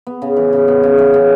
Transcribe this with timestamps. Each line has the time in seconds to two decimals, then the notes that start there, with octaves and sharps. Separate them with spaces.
0.07 B3
0.22 C#3
0.37 E3
0.53 C#3
0.68 B3
0.83 C#3
0.98 E3
1.14 C#3